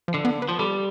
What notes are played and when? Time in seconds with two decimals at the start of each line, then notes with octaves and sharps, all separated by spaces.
0.08 F3
0.14 D3
0.25 B3
0.42 B3
0.49 F3
0.59 G3 A3